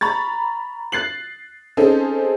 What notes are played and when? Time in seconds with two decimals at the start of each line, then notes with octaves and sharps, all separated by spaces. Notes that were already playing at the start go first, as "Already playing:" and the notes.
0.01 A#5 B5 C#6 A6
0.92 F#6 A6 C7 F#7
1.77 C4 C#4 D#4 G#4 A4 C5